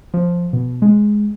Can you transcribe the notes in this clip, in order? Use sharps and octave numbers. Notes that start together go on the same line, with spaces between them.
F3
B2
G#3